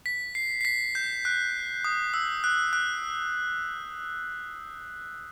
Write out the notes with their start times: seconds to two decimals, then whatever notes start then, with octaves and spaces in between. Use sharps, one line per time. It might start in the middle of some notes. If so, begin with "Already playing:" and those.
0.06 B6
0.35 C7
0.61 C7
0.65 B6
0.95 G6
1.25 F#6
1.84 D#6
2.14 E6
2.44 F#6
2.73 F#6